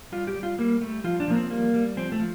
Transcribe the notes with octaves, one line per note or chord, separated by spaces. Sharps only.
G3 F4
G4
G3
F4
G3 A#3
G3 A3
F3 F4
D4
F3 A#3
C4
G3 A#3
G3
F3 C4
A3
F3